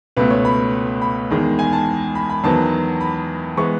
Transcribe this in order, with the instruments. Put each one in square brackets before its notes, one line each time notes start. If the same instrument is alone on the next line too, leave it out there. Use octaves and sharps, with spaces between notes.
[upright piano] C#2 B2 A3 B4
C#5
B5
B5
E2 D#3 G#3
G#5
A5
B5
B5
E2 D#3 F#3 B3 A5
B5
E3 G#3 B3 C#6